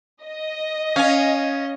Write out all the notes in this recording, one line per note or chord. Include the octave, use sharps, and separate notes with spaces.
D#5
C#4 F5 G#5